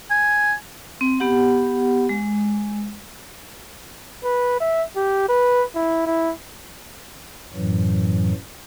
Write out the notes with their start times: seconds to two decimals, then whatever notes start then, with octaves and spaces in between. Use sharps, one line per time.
0.11 G#5
1.01 C4
1.20 B3 G4 F#5
2.09 G#3
4.24 B4
4.60 E5
4.96 G4
5.29 B4
5.75 E4
6.06 E4
7.54 F#2 A2 E3 F#3